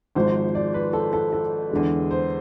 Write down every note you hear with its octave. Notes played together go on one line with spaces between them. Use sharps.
G#1 G#2 F3 G#3 C5
D5
B4
A4
A4
A4
E2 D3 G#3
C5